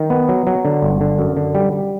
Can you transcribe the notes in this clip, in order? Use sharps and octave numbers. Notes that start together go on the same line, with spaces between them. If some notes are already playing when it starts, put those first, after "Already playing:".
Already playing: D#3
B3
F#3
F#3
D3
G1
D3
F#2
D3
G3
G3